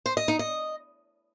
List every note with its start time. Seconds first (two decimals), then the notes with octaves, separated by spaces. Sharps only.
0.06 C5
0.17 D#5
0.28 D#4
0.39 D#5